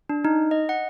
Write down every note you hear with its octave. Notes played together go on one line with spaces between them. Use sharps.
D4
D#4
D#5
F#5